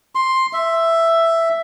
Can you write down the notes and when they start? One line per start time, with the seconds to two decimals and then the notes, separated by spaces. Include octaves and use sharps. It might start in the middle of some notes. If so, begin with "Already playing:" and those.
0.15 C6
0.53 E5